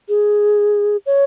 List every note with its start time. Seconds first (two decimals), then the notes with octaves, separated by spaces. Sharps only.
0.09 G#4
1.06 C#5